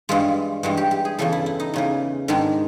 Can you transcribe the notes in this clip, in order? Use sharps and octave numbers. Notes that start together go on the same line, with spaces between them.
G2 E3 G#3 F4
G2 E3 G#3 F#4
G4
G4
G#4
E2 C#3 E3 A4
E4
E4
D#4
E2 C#3 E3
G#2 D#3 G#3 D4